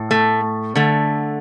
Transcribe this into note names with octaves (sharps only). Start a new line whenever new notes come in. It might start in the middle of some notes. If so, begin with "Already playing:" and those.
Already playing: A2
A3
D3 A3